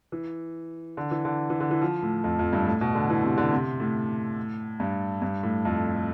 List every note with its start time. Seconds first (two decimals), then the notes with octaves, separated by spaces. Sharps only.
0.12 E3
0.97 D3
1.11 E3
1.25 D3
1.50 E3
1.60 D3
1.71 E3
1.82 F3
2.03 A2
2.24 F2
2.39 F2
2.53 G2
2.66 A2
2.81 B2
2.95 D3
3.10 E3
3.23 C3
3.38 D3
3.52 C3
3.80 A2
4.80 G2
5.22 G2
5.43 A2
5.65 F2